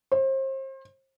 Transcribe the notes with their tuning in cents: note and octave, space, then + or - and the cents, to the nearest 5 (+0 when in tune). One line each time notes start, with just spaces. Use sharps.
C5 +35